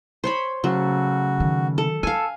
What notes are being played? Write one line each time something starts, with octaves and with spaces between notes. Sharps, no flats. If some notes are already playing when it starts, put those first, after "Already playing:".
C5 C#5 B5
C#3 F#3 A3 F#4
D#3
A4
D4 A4 F5 G#5